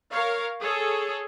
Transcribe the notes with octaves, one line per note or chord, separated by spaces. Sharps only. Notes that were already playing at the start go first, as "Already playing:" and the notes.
A#4 C#5 F5
G#4 A4 C#5